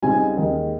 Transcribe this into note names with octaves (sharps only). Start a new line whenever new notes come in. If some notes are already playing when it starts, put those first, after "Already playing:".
C#2 C#3 G3 C4 D#4 G#5
D#2 D#3 G#3